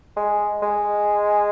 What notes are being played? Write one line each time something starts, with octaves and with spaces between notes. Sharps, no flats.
G#3
G#3